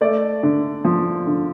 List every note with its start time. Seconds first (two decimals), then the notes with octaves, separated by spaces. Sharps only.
0.01 A3 D5
0.43 D3
0.85 F3
1.27 D3